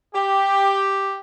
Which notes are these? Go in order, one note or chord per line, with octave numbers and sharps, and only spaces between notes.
G4